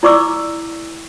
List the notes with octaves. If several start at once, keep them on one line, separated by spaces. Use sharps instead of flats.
E4 D5 C#6 D6 E6